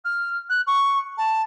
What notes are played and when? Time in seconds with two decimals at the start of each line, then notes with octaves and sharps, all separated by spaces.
0.04 F6
0.49 F#6
0.67 C#6
1.17 A5